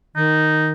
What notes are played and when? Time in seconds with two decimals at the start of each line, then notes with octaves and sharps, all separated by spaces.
0.15 D#3 D#4